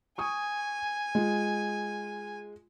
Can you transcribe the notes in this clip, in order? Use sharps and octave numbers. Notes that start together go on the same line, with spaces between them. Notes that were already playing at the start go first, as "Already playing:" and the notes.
G#5 C#6 D#6
G#3 F4